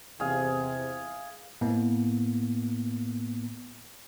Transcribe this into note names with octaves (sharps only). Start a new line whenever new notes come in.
E2 C3 G#4 F5
A2 A#3 B3